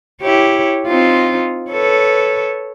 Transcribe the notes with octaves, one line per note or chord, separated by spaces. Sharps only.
E4 G4 C#5
C4 D#4 F4
A4 B4 C#5